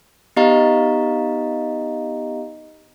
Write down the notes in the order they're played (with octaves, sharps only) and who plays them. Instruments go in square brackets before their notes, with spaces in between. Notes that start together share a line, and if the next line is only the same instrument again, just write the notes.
[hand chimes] B3 D#4 G4 D#5 F5 A#5